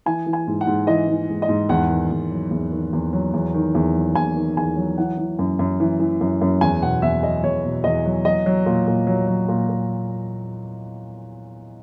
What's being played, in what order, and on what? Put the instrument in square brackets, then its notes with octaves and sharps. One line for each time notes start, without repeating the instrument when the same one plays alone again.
[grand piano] E3 G#5
E3
G#5
G#2
F#5
G#2
E3 D#5
E3
G#2
D#5
G#2
E2 F#5
D#3
E2
F#3
E2
D#3
E2
F#3
E2
D#3
E2
F#3
E2 G#5
D#3
E2 G#5
F#3
E3 F#5
E3
F#2
F#2
E3
E3
F#2
F#2
E2 G#5
B2 F#5
E2 E5
F#3 D#5
E2 C#5
B2
E2 D#5
F#3
F#3 D#5
F#3
A#2
A#2
F#3
F#3
A#2
A#2